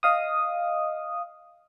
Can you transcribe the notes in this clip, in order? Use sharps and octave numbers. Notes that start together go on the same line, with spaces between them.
D#5 F5 D#6